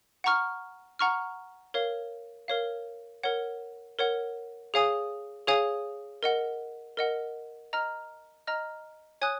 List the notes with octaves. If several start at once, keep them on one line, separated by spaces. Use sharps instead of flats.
F#5 A#5 C#6 F6
F#5 A#5 C#6 F6
A#4 C#5 F5
A#4 C#5 F5
A#4 C#5 F#5
A#4 C#5 F#5
G#4 C#5 F5 G#5 D#6
G#4 C#5 F5 G#5 D#6
A#4 D#5 F#5
A#4 D#5 F#5
D#5 A#5 F6
D#5 A#5 F6
C#5 G#5 D#6 F#6